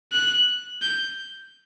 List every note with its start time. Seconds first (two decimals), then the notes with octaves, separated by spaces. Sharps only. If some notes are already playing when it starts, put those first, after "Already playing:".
0.13 F#6
0.82 G6